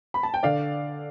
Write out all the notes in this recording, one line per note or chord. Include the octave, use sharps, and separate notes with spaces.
B5
A5
G5
D3 D5 F5